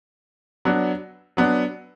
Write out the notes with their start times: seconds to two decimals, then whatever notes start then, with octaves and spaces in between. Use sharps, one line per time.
0.65 F#3 B3 D4
1.37 F#3 B3 D4